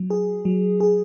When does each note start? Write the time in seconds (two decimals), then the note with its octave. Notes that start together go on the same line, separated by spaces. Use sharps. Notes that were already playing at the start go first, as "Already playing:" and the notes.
Already playing: F#3
0.10 G#4
0.45 F#3
0.80 G#4